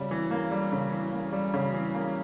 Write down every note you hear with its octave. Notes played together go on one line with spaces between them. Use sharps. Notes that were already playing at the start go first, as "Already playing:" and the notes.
Already playing: C#3 G3
E3
A#3
G3
C#3
E3
A#3
G3
C#3
E3
A#3